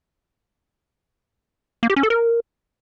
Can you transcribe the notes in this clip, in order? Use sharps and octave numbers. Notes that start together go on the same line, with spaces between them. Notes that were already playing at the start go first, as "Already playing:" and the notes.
A#3
G4
C#4
A4
A#4